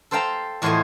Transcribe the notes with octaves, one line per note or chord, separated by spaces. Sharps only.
A4 C5 F5 G5 A5 A#5
E2 A2 F3 C5 D#5 G#5